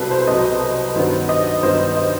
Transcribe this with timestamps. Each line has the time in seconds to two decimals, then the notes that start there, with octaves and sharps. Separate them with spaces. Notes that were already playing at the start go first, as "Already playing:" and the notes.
Already playing: C2 B2 F#3 A4 B4
0.11 C5
0.22 C5
0.27 C2 B2 F#3 D#5
0.95 G2 D#3 F#3 B3 C5
1.29 D#5
1.63 G2 D#3 F#3 B3 C5
1.97 D#5